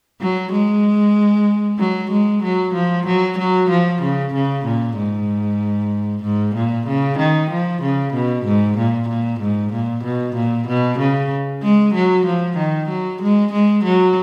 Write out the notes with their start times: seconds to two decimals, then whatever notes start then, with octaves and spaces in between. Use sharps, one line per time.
0.21 F#3
0.52 G#3
1.79 F#3
2.11 G#3
2.43 F#3
2.74 F3
3.06 F#3
3.38 F#3
3.70 F3
4.02 C#3
4.34 C#3
4.65 A#2
4.97 G#2
6.23 G#2
6.55 A#2
6.87 C#3
7.18 D#3
7.50 F3
7.82 C#3
8.14 B2
8.45 G#2
8.77 A#2
9.09 A#2
9.40 G#2
9.73 A#2
10.04 B2
10.35 A#2
10.68 B2
10.99 C#3
11.62 G#3
11.94 F#3
12.26 F3
12.57 D#3
12.89 F#3
13.22 G#3
13.52 G#3
13.84 F#3